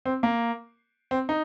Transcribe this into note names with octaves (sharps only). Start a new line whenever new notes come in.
C4
A#3
C4
D#4